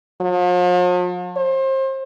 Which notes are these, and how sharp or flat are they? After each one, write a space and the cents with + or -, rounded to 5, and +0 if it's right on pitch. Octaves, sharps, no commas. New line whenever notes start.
F3 +45
C5 +30